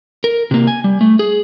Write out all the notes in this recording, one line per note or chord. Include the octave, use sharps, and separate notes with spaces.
A#4
C3 A#3
G#5
G3
A3
G#4